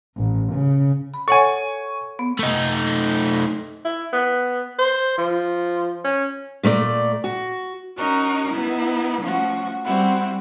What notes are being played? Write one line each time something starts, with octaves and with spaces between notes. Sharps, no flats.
A1
C#3
B5
A4 C#5 F#5 G#5 C#6
B3
A3 D#4
E4
B3
C5
F3
C#4
A#2 A3 C#5 D5
F#4
C#4 D#4 F#4 A#4
B3 D#4 E4
F3 A3 C#4 F#4
G3 C4 E4 F#4